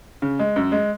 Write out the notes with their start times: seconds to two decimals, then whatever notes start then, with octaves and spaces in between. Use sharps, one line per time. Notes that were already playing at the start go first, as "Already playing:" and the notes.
0.22 C#3
0.39 G#3
0.56 F#2
0.72 G#3